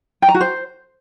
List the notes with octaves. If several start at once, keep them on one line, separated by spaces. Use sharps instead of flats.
G5
A#5
F#4
C5